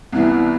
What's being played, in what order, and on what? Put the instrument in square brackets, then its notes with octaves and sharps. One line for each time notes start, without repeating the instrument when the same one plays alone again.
[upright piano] C2 C3 E3 B3 E4